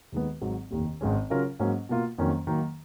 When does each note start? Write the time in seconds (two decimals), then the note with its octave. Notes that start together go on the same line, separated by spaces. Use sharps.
0.12 D#2 D#3 G#3 B3
0.41 G#1 G#2 F#3
0.71 F1 D#2 D#3
1.01 G#1 G#2 D#3 G#3 C#4
1.30 C#3 F#3 C#4 F4 A#4
1.59 G#2 F#3 A#3 C#4
1.89 B2 A#3 F4
2.18 F2 D#3 F#3 A#3 C#4
2.47 D#3 F#3 A#3